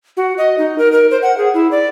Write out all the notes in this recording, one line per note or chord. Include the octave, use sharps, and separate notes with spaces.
F#4
D#5
D#4
A#4
A#4
C5
F#5
G#4
E4
D5